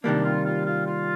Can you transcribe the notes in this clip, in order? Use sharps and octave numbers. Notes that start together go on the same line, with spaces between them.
C3 D#3 G3 A#3 D4
F4
F4
F4
F4